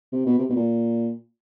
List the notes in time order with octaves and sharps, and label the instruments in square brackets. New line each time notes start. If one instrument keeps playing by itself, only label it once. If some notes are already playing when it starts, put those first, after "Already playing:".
[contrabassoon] C3
B2
C3
B2
A#2